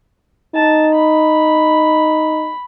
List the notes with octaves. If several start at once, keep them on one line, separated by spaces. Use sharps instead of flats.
D#4 A5
B5